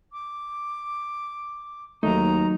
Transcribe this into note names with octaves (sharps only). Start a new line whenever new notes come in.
D6
D#2 F#3 A3 D#4 A#5